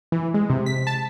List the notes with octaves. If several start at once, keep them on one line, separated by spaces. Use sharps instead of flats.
E3
G#3
C3
B6
A5